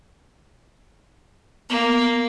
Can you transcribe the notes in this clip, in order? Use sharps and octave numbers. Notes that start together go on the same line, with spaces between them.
A#3 B3